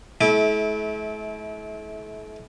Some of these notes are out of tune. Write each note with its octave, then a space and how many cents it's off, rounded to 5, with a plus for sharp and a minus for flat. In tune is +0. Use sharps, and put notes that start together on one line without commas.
A3 -40 E4 -25 D6 +5